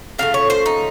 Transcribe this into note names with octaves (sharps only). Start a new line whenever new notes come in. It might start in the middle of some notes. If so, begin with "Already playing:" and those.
C#3 F3 A3 F5
C#5
C5
D#4